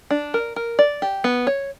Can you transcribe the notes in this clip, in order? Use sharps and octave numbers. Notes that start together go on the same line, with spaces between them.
D4
A#4
A#4
D5
G4
B3
C#5